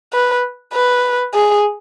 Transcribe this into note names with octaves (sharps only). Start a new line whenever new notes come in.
B4
B4
G#4